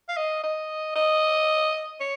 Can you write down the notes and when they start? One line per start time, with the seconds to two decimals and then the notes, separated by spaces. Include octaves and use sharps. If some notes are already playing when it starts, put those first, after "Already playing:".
0.09 F5
0.17 D#5
0.43 D#5
0.96 D#5
2.01 C#5